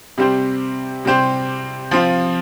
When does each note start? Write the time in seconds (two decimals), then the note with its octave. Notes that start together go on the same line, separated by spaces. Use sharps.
0.18 C3 G3 C4 G4 C5
1.05 C3 G3 C4 G4 C5
1.91 F3 C4 F4